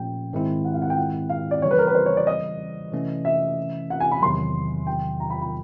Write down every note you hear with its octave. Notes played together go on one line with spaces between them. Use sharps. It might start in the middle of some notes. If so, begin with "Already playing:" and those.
Already playing: A#2 F3 A3 C#4 G5
G#2 D#3 G#3 C4 E4
F#5
F5
F#5
G5
F#5
F5
D5
C#3 E3 G3 C#5
B4
A#4
B4
C5
C#5
D5
D#5
C3 E3 A3 C#4
E5
F#5
G#5
B5
E2 C3 D#3 F#3 C6
G5
A#5
B5
B5